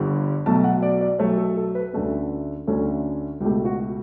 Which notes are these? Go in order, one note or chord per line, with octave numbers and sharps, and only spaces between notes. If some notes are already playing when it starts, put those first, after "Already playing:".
Already playing: G1 G2 D3 G3
B1 B2 A3 A5
F#5
D5
D5
B1 B2 A3 C#5
A4
A4
B4
D2 D3 A3 C#4
D2 D3 A3 C#4 A4
C#2 B2 A3 G4
F#4